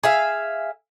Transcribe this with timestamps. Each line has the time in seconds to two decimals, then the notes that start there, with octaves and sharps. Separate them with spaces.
0.03 G#4 E5 F5